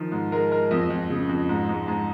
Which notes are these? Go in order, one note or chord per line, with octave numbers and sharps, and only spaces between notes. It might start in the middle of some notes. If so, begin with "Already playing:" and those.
Already playing: D#3 F3
G#2
G#3 A#4
G#3 A#4
F2 D#5
F2
C#3
F2
G#2
G#2
G#2